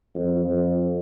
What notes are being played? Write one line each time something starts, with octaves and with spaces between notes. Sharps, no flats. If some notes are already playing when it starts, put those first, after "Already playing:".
F2
F2